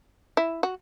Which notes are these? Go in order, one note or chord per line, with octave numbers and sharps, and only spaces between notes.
E4
F#4